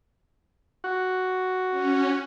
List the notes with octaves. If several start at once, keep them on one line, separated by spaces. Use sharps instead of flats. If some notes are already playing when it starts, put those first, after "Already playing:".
F#4
C#4